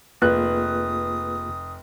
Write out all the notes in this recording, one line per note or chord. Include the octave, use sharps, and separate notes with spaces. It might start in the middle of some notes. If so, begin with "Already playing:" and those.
F1 A#3 F4 G#4 B4 D#6 F#6